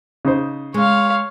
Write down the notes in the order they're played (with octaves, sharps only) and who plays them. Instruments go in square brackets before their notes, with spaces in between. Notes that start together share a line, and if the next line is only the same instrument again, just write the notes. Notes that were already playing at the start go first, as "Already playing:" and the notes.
[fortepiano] C#3 D#4 C5
[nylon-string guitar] G#3 [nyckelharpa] C#5 F5